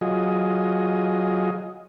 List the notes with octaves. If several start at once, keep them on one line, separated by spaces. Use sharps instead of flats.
F#3 F4 G#4 D#5